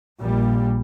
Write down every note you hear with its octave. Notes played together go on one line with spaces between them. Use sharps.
A#1 A#2 G3